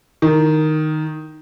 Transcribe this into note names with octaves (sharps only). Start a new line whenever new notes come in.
D#3